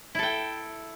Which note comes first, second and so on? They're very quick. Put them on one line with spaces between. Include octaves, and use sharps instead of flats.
E4 A4 G5